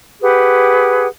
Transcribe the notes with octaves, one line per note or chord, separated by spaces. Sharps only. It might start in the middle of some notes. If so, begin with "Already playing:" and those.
G4 G#4 B4 F#5